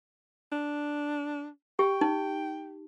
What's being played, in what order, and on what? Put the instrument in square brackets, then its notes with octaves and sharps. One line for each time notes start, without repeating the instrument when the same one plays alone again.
[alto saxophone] D4
[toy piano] G4 [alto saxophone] G5
[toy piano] D#4